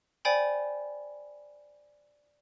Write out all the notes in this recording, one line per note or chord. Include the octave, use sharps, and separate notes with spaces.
C5 D5 G5 G#5 B5